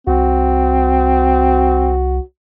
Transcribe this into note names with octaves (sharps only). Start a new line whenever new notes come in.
C2 C4 F#4